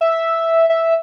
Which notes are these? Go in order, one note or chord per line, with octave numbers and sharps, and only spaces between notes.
E5
E5